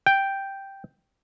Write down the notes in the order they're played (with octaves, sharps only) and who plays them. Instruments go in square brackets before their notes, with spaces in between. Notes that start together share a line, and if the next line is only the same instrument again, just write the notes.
[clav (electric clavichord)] G5